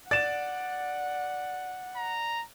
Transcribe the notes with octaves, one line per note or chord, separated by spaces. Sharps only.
D5 F#5 A6 E7
A#5